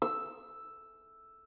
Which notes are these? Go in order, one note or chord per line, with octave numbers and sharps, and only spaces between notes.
E6